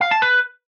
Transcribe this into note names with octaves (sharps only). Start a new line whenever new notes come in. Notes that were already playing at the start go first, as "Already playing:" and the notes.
F5
A5
B4